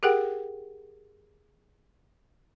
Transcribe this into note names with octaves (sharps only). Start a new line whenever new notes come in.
G4 G#4 A#4 F#5 G5